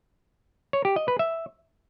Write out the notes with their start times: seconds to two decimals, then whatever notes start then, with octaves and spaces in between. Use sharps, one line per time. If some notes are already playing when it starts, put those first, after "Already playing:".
0.73 C#5
0.85 G4
0.96 D#5
1.08 B4
1.19 E5